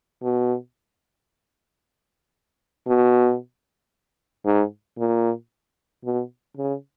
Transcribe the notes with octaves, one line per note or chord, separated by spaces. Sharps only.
B2
B2
G#2
A#2
B2
C#3